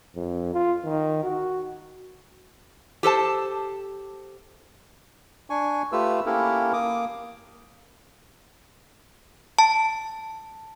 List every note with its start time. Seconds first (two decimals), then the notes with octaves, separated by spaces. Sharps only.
0.16 F2
0.54 F4
0.85 D#3
1.23 F#4
3.03 G4 A4 C5 A5
5.50 D4 G#5 C#6
5.92 A3 F4 G4 B4 E6
6.26 A#3 C#4 E4 G4 A4 A#4
6.73 A#3 D6 D#6
9.59 A5